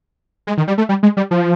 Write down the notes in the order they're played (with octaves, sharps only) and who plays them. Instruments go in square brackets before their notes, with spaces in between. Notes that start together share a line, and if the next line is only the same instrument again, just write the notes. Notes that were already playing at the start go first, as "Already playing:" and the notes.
[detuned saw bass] G#3
D#3
G3
A3
G3
G#3
G3
F3